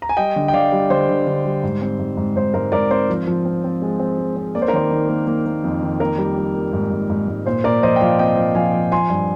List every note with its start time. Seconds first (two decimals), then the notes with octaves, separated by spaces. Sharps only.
0.02 A#5
0.09 G#5
0.17 G3 D#5 G5
0.36 D3
0.48 G5
0.53 D3 D5 F5
0.72 G3
0.90 D3 C5
1.09 D3
1.27 D3
1.45 G3
1.63 G#2
1.82 C4
1.99 G#2
2.17 G#2
2.36 G#2 C5
2.54 G#2 A#4
2.72 G#2 A#4 D5
2.91 C4 C5
3.09 F3
3.27 F3
3.45 C4
3.64 C4
3.82 G#3
4.00 C4
4.18 G#3
4.37 C4
4.55 A#3 D5
4.62 C5
4.68 A#4
4.73 D#3 C5
4.91 D#3
5.09 A#3
5.27 A#3
5.46 A#3
5.64 F2
5.83 D#3
6.00 A#3 A#4
6.18 G3
6.37 G3
6.55 A#3
6.73 G#2
6.91 G#2
7.10 G#2
7.28 G#2
7.46 A#2 C5
7.64 A#2 A#4 D5
7.82 F3 C5 D#5
7.96 G5
8.01 F3 D5 F5
8.19 C4 D#5 G5
8.37 F3
8.55 F3 F5 G#5
8.73 F3
8.92 F3 G#5 C6
9.10 G2